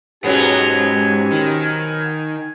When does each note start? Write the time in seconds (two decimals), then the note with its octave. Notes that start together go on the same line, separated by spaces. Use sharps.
0.24 G#2 B2 F#3 B3 C#4 G4 C5 G#5
1.32 D#3